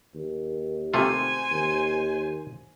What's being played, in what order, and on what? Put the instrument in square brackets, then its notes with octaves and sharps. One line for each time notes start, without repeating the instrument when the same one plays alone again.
[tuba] D#2
[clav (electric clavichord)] C3 A3 F4 [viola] C5 G#5
[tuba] D#2